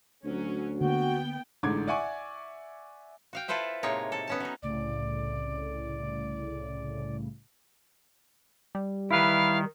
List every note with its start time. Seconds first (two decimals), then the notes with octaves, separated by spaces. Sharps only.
0.24 D2 F#3 C#4
0.81 D3 A#3 B3 F#4 G5
1.63 A1 G#2 D3 D6 G#6
1.87 D5 E5 F#5 G#5 C#6 D6
3.33 F#4 F5 G5
3.48 E4 F4 A4 B4 C5 E5
3.83 A2 C3 G#3 A#3 D#4 C#5
4.12 A4
4.27 B3 C#4 A5
4.40 F#3 D#4
4.62 C2 A2 C#3 D5
8.75 G3
9.11 D#3 E4 B4 F5